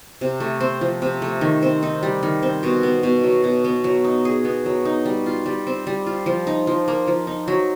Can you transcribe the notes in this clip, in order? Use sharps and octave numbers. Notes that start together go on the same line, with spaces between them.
C3
A3
C4
F3
C3
A3
D#3
C4
D#4
G3
D#3
C4
B2
B3
B2
F#3
B2
B3
F#3
D#4
G#4
B3
F#3
D#4
G3
F4
G3
C4
G3
F4
F3
D#4
F3
A#3
F3
D#4
F#3